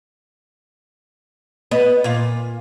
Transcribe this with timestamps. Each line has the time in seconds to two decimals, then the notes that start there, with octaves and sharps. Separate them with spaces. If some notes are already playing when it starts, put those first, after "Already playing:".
1.71 B3 D#5
2.04 A#2 F4